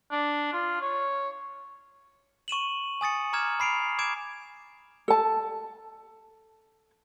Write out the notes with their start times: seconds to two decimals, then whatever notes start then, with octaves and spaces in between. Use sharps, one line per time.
0.11 D4
0.53 F4
0.81 C#5
2.48 C#6 D#7 E7 F#7
3.01 G#5 D#6 A6 C#7
3.33 A#5 D6 F6 G#6 E7
3.60 B5 C7 D7 F7
3.99 D6 G#6 D7 E7
5.08 A4 A5